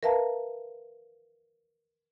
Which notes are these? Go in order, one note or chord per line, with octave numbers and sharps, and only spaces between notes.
A#4 B4 E5 F5 A5 A#5